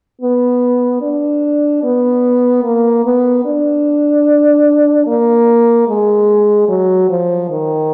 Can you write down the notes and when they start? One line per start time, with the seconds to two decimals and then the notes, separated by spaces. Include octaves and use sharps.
0.21 B3
1.01 D4
1.83 B3
2.63 A#3
3.05 B3
3.45 D4
5.07 A#3
5.88 G#3
6.69 F#3
7.09 F3
7.50 D#3